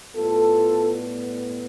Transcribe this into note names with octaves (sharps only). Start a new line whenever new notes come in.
A2 G3 B3 F4 A4